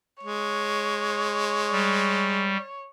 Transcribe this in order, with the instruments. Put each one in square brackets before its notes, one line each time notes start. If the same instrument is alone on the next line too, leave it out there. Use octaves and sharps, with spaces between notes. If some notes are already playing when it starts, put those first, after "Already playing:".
[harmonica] G#3 [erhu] C#5
[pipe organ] G3